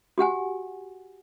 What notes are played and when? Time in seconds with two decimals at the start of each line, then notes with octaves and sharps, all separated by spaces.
0.18 F#4 G4 F#5 G#5